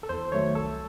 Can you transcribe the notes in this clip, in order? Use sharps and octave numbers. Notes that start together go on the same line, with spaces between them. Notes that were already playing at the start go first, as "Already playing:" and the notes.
A4
E2 C5
D#3 F#3 A3 C#5
C2 A4